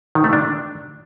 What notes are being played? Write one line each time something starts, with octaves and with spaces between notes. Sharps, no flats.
D#3
A3
D4